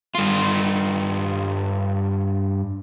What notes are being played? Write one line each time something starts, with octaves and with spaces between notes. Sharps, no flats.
G2 F4